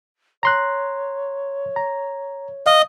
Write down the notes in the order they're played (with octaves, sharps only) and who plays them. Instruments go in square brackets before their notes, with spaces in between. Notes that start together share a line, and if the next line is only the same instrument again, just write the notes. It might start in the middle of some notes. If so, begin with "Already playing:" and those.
[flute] C#5 [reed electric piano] A#5 C6 F#6
[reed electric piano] A#5
[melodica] D#5 [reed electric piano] F5